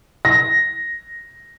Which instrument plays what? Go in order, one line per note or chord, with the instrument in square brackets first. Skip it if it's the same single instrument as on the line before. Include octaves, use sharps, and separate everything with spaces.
[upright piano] A#6